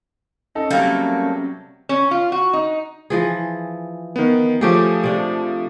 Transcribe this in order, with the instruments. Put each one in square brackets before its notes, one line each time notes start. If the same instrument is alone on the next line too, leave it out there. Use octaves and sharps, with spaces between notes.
[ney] C#4 [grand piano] D#4 A4
[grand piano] C3 F#3 [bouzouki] G3 A3 A#3 [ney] C#4
[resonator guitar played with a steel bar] C#4
F4
F#4
D#4
[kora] E3 F3 G#4
[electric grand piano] D#3 B3
[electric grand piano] F3 A3 [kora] C#4 G4 G#4
[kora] C3 D4